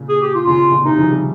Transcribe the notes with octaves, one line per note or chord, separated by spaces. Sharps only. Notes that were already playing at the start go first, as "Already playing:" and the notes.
Already playing: A#2 C#3
G#4
G4
F4
C#3 F4
C3
A#2 C#3
C3 D#3 D#4
C#3 F3
D#3 G3